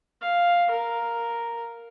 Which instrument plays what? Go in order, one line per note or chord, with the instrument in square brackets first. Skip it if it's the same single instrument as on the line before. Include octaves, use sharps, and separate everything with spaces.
[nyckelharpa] F5
A#4